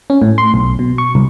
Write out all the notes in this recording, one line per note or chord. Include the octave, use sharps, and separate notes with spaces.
C#4
A2
C6
B1
B2
C#6
C2